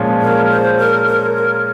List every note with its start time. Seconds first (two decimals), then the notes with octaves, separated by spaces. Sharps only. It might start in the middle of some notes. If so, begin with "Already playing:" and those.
Already playing: A#2 F3 G#3 C#4 F4
0.22 A#4
0.50 C5
0.78 A#4
1.07 A#4
1.35 A#4